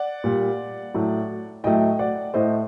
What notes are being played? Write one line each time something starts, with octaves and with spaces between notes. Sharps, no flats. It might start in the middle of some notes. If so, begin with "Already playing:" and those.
Already playing: D5 F#5
A#2 G3
A2 F#3 A3
A2 F#3 A3 D#5 G5
D5 F#5
A2 A3 C5 D#5